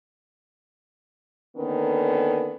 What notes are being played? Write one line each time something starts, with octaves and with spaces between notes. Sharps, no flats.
D3 D#3 A#3 B3 C#4